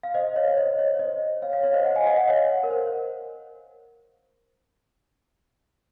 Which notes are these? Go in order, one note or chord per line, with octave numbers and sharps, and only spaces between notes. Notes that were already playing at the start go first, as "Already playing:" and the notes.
F5
C5 D#5
C#5 F5
C#5
C5 D#5
C#5
C5 D#5
C#5 F5
C#5 F5
C#5 F5
C5 D#5
D#5 F#5
F5 G#5
D#5 F#5
D#5 F#5
C#5 F5
A#4
C5